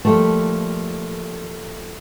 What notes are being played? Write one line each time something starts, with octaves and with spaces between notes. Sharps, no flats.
F3 G3 A3 A#3